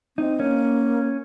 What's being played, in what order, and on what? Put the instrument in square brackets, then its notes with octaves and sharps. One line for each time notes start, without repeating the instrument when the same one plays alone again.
[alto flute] C4 [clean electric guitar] D#4
[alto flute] A#3 [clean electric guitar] C#4